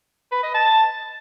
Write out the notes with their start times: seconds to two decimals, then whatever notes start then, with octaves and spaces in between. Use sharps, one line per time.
0.32 B4
0.43 D#5
0.54 A5